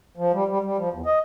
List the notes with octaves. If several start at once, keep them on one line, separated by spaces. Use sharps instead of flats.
F3
G3
G3
G3
F3
E2
D#5